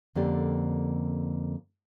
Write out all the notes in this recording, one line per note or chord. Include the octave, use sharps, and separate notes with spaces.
F2 D3 A#3 C#4 G4 D5